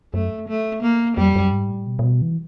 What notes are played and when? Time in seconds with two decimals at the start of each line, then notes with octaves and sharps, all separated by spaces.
0.14 F#2 A3
0.48 A3
0.83 A#3
1.17 F2 G3
1.36 F#2
1.52 G#2
1.69 A2
1.87 B2
1.99 A#2
2.04 B2
2.22 E3